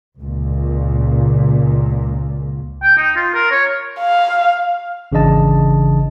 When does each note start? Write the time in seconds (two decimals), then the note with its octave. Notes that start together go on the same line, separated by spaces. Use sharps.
0.19 C#2 A#2
2.83 G5
2.97 D#4
3.16 F4
3.34 A#4
3.52 C#5
3.99 F5
5.12 G#1 C#3 E3 D4 D#5 A5